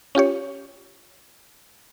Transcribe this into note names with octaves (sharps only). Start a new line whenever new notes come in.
C#4 F4 G4 C#5